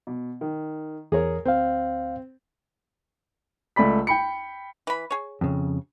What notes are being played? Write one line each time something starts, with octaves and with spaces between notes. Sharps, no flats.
B2
D#3
E2 G#4 A#4 C#5
D2 C4 F5
C#2 A3 D5 B5 B6
G5 B5 C#7
E3 B5
G#4 C#5
F2 C#3